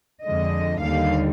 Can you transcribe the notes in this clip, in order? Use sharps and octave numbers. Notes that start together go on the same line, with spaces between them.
F2 D3 G#3 D#5
D#2 D3 G3 F5